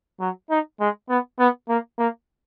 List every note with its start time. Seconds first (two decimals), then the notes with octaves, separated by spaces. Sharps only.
0.20 F#3
0.50 D#4
0.80 G#3
1.09 B3
1.39 B3
1.69 A#3
1.98 A#3